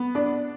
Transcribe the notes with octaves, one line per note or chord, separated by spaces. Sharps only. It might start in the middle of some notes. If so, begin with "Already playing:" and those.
Already playing: B3
D4